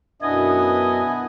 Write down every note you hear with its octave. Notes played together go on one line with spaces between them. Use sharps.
F#2 B2 B3 D4 E4 D#5 G#5